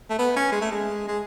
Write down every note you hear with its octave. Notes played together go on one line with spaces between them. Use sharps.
A3
B3
C#4
G#3
A3
G#3
G#3